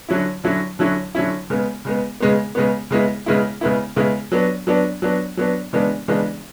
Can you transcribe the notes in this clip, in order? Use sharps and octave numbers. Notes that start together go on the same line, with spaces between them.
D3 F#3 C#4 E4
D3 F#3 C#4 E4
D3 F#3 C#4 E4
D3 F#3 C#4 E4
C#3 G#3 B3
C#3 G#3 B3
C#3 G#3 B3
C#3 G#3 B3
C#3 G#3 B3 E4
C#3 G#3 B3 E4
C#3 G#3 B3 E4
C#3 G#3 B3 E4
F#3 B3 D4
F#3 B3 D4
F#3 B3 D4
F#3 B3 D4
C#3 E3 G#3 B3 D4
C#3 E3 G#3 B3 D4